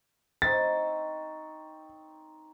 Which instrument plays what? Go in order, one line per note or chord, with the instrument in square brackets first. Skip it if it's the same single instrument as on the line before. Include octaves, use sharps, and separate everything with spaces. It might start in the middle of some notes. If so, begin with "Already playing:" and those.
[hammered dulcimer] C4 D#4 C#5 [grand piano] A6